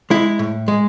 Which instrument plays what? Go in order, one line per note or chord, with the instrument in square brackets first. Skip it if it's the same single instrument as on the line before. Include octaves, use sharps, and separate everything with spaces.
[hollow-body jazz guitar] G#3 E4
A2
G#3